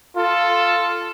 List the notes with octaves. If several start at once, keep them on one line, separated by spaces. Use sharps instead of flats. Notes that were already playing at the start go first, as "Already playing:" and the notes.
F4 A4